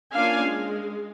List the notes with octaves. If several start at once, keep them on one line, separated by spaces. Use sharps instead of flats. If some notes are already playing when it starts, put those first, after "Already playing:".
A#3 C#4 D4 F4 F5 G#5
G#3